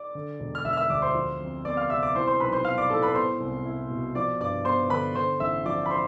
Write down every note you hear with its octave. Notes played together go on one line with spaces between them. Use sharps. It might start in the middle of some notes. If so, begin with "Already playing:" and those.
Already playing: D5 D6
D3
E1
F6
E1 E5 E6
F6
E5 E6
D2 D5 D6
C5 C6
F3
F2
B3 D5 D6
F5 F6
C3 E5 E6
D5 D6
E3 C5 C6
C5 C6
B1 B4 B5
C5 C6
B3 F5 F6
D5 D6
A2 A4 A5
B4 B5
B3 C5 C6
C2
E4
B2
F3 D5 D6
G2 D5 D6
B3 C5 C6
D3 B4 B5
D3 C5 C6
A1 E5 E6
F3 D5 D6
B5
C5 C6